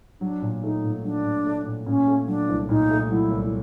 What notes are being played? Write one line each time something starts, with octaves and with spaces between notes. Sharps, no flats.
F#3 D4
A#2
A3 D#4
A#2
F#3 D4
A#2
A3
A#2
A#2 C#4
A3
F#3 D4
C2
A#2 D#4
A3
F#3 E4
C2